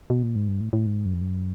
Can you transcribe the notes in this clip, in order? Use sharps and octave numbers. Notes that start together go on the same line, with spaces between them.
B2
A#2
G#2
G2
A2
A2
G#2
F#2
F2
F#2